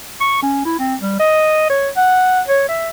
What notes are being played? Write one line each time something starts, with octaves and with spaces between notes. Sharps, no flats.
C#6
C#4
E4
C4
G3
D#5
C#5
F#5
C#5
E5